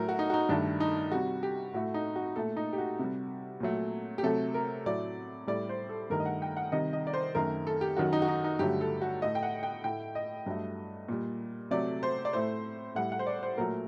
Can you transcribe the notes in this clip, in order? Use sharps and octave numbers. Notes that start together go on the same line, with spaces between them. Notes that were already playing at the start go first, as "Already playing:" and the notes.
Already playing: A2 F#3 A3 A#4
F#4
D#4
F#4
D#4
G2 D#3 A3 D4
D#4
C3 G3 F#4
G4
A2 A3 F#4
D#4
F#4
A#2 A3 A4
D#4
G4
F#4
C3 G3
A#2 F#3 A3
G4
C3 F#3 A3 A4
A#4
A2 F#3 A3 D5
A2 G3 D5
C5
A4
G2 D#3 A3 A#4
D#5
F#5
G5
F#5
C3 D#3 G3 D#5
D#5
D5
C5
F#2 D#3 A3 A#4
A4
G4
F#2 D#3 F#3 F#4
D#4
F#4
D#4
D#4
G2 D3 F#3 A3 G4
A4
F#4
A2 A3 D#5
G5
F#5
G5
A2 A3 G5
D#5
G2 F#3 A3
A#2 G3
C3 F#3 A3 D5
C5
D5
A2 A3 C5
A2 G3 F#5
F#5
C5
D5
C5
A#2 F#3 A3 A#4